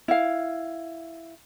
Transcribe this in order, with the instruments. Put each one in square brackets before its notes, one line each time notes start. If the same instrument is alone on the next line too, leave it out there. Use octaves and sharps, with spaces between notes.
[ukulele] E4 F5